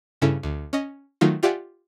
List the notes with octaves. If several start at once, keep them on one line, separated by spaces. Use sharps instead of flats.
G2 C#3 C#4 E4 A4
D2
C#4 D#5
D#3 F#3 A3 D#4 F4
F4 G4 D5 E5 F#5 G#5